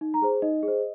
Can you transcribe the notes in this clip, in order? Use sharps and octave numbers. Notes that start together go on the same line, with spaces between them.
D#4
A#5
G#4 C5
D#4 D#5
G#4
C5